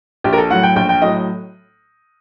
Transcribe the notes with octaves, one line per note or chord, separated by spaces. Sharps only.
A#1 G4
A#4
A4
A2 F#3 F#5
G5
A#1 G5
G5
A2 F#3 D#5